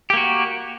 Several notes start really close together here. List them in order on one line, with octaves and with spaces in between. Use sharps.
G4 A#3 F#4